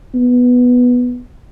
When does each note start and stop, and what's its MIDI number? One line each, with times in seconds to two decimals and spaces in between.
0.14 1.21 59